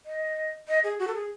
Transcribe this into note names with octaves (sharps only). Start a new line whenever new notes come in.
D#5
D#5
G#4
F#4
A4
G#4